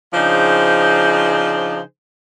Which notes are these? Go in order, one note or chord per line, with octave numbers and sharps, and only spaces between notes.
C#3 F3 D4 D#4 G#4 C5